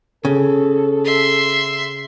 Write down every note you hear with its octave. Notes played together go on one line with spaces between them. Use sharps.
C#3 A4
E5 C6